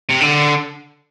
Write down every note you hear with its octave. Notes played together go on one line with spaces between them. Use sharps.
C3
D3